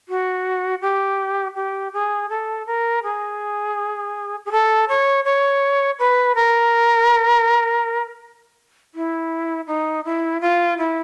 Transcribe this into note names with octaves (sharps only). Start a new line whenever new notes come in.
F#4
G4
G4
G#4
A4
A#4
G#4
G#4
A4
C#5
C#5
B4
A#4
E4
D#4
E4
F4
E4